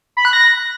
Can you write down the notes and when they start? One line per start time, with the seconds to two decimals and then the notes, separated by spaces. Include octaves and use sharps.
0.17 B5
0.25 F#6
0.33 A#6